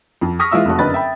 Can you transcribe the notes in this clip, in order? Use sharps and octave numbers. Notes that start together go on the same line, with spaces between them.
F2
C#6 D#6 F6 A#6 B6
E3 G#3 F4 E5 E6
F1 A3 F#4
F#1 D3 B4 D#5 B5 A6
E5 G5 B5